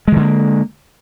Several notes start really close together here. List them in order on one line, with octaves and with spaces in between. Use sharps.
G#3 D#3 D3 A#3